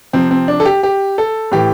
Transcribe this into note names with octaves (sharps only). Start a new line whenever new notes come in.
C3 F3 C4
C4
D4
A4
G4
G4
A4
A2 E3 G4